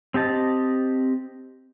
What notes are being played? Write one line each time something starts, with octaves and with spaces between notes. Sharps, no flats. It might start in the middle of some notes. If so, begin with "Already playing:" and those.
C4 G4 D#5 A5